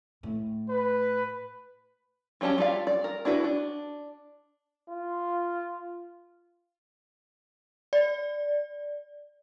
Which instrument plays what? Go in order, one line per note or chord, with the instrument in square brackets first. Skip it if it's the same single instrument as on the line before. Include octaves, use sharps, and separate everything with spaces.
[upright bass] A2
[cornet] B4
[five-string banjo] F#3 G3 C#4 G4 A5
G3 F4 D5 F5
D5
A#4
D4 E4 F#4 B4
D4
[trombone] F4
[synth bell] D5